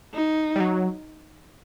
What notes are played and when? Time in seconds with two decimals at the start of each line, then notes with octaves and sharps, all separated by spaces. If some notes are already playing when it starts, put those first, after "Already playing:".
0.14 D#4
0.56 G3
0.60 F#3